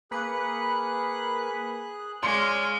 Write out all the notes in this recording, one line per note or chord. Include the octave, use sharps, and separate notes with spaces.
A#3 G#4 B4 F#6 C#7
G#3 C#5 D5 F5 C6